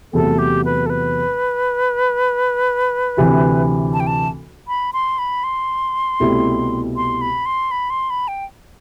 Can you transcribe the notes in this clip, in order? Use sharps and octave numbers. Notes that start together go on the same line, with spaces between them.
E2 C3 F#3 A3 A4
G4
B4
A4
B4
D2 C3 E3
A5
G5
A5
B5
C6
B5
C6
C2 B2 A3 E4 G4
C6
B5
C6
B5
C6
B5
G5